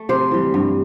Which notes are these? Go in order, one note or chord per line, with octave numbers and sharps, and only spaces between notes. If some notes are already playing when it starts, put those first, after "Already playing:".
Already playing: A3
C3 C5
E3 G3
G2